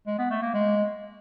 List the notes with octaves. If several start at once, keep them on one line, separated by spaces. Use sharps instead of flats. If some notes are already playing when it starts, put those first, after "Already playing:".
G#3
B3
A3
A#3
G#3